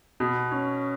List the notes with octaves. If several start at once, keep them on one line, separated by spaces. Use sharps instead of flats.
B2
C#4